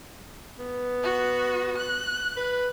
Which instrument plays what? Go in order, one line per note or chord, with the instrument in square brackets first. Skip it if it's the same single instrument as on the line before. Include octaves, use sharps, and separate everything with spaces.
[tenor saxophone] B3
[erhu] F#4
F#6
[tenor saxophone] B4